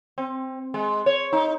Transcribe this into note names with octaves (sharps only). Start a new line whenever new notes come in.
C4
G#3
C#5
D#4